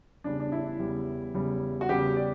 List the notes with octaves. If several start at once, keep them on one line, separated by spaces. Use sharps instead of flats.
E2 C#3 G3 D4
D4
E4
E2 C#3 G3
E2 C#3 G3
F#4
E2 C#3 G3 G4
D5